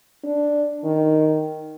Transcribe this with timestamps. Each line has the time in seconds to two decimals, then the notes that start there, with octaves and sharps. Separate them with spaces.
0.24 D4
0.84 D#3